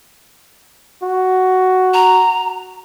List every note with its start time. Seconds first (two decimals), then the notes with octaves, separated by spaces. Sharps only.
1.03 F#4
1.94 A#5